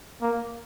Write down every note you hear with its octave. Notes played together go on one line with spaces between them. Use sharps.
A#3